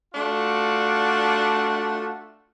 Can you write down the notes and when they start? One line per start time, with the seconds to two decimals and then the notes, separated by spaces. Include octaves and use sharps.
0.14 A3 D4 F4 F#4